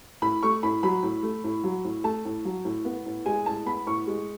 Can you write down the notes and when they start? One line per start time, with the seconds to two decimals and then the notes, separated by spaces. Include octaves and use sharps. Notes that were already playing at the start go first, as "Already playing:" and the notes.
0.22 A2 B5
0.43 A3 C#6
0.63 A2 B5
0.83 F#3 B5
1.03 A2
1.23 A3
1.44 A2
1.64 F#3
1.84 A2
2.04 A3 A5
2.25 A2
2.45 F#3
2.65 A2
2.85 B3
3.06 A2
3.26 G#3 G#5
3.46 A2 A5
3.66 B3 B5
3.86 A2 C#6
4.07 G#3